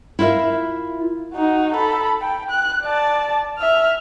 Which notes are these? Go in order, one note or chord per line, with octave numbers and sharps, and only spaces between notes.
E4 F4 A#4 E5 F5
D#4 F#4
A4 B5
G5
F#6
D5 A5
E5 F6